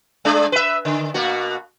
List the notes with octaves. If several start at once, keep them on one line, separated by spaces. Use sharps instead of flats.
G#3 D4
B4 E5
D3
B2 A#3 F#4